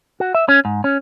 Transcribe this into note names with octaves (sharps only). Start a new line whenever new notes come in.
F#4
E5
C#4
G#2
C#4